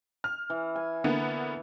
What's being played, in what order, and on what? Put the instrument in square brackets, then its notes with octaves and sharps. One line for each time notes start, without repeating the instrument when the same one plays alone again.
[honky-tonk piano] F6
[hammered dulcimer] E3
G#5
[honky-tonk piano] D3 A#3 B3